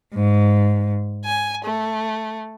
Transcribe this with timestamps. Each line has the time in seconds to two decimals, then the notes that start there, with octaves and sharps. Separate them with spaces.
0.14 G#2
1.24 G#5
1.64 A3